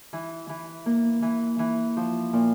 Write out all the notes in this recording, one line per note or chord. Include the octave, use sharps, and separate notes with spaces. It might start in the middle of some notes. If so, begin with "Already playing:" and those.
E3
E3
A#3
E3
E3
F3
A#2